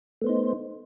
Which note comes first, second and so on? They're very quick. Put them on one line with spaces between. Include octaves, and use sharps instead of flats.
A3 B3 C5 D#4